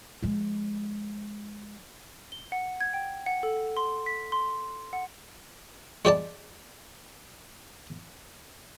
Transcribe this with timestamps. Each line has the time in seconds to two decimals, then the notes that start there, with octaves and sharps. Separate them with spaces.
0.23 F3 G#3
2.32 G7
2.52 F#5
2.81 G#6
2.93 G5
3.26 F#5
3.43 A4
3.77 C6
4.06 B6
4.32 C6
4.93 F#5
6.05 G#3 G4 D5 A5